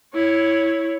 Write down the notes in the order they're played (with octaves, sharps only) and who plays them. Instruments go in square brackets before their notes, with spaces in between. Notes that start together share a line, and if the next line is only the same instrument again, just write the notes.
[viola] E4 C#5